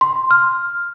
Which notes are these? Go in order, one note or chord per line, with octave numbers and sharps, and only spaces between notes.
C6
F6